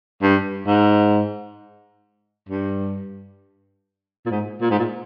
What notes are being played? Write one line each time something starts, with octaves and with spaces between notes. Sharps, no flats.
G2
G#2
G2
A#2
G#2
A#2
G#2
A#2